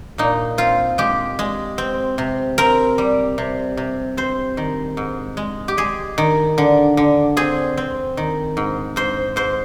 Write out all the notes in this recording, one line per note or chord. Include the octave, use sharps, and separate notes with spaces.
A#2 D#4
C4 F4
G#3 G4
G#3
C4
C3
C4 A#4
G3
C3
C3
C4 C5
D#3
G#2
G#3
G4
G#3 G#4
D#3
D3
D3
C4 G#4
C4
D#3
G#2
G#2 C5
G#2 C5